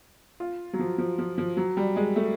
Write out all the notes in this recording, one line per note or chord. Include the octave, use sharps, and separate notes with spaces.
F4
F#3
F3
F3
F3
F3
F#3
G3
G#3
A3